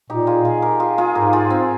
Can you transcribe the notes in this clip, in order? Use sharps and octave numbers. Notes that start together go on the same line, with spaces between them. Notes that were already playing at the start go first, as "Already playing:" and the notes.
A#2 D#4 G4
F4 G#4
F4 G#4
G4 A#4
F4 G#4
F4 G#4
G#2 G4 A#4
F4 G#4
C4